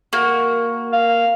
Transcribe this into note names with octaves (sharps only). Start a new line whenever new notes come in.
A#3 F#4
F5